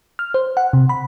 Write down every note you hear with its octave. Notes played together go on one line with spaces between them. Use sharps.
F6
C5
F#5
C3
B5